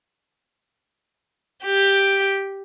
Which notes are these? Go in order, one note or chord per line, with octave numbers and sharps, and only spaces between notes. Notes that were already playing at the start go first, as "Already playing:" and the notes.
G4